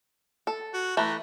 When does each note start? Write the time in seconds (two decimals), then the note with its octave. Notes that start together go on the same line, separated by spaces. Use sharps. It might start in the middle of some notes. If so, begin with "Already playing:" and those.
0.47 A4
0.74 F#4
0.97 E3 A3 B4 A#5